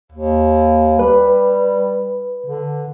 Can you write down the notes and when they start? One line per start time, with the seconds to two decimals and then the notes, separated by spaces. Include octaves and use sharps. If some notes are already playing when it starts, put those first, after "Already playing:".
0.12 D#2
0.99 G3 B4
2.46 D3